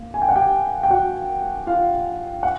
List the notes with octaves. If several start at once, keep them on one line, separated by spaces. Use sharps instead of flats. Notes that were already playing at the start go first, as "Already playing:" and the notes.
Already playing: A#3
G#5
G5
F#5
G4 G5
G5
F#4 F#5
F4 F5
F#5